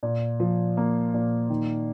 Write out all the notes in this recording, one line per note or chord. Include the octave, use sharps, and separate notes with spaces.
A#2
F3
A#3
A#2
D#3